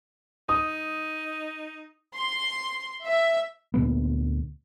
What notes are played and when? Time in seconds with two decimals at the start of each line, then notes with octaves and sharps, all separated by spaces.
0.49 D#4 D#6
2.17 C6
3.06 E5
3.74 D2 A#2 A3 B3